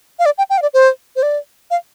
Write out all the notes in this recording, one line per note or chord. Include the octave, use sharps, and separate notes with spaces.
F5
D5
G5
G5
F5
D5
C5
C5
D5
F5